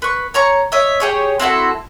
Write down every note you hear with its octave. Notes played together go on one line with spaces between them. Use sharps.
B4 C#6
C#5 A#5 C#6
C#5 D#5 E5
G4 G#4 C#5
C4 E4 F#4 A4